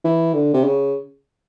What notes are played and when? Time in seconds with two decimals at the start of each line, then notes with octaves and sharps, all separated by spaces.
0.04 E3
0.34 D3
0.54 C3
0.64 C#3